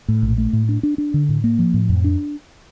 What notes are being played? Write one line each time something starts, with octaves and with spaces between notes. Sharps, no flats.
A2
A#1
A3
A2
D4
D4
D4
D3
A2
A#3
F3
A2
F2
D4